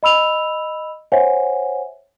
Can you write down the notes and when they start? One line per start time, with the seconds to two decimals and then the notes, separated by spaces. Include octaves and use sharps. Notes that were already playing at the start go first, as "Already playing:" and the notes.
0.03 D#5 B5 E6 F7
1.12 C5 C#5 E5 F#5 G#5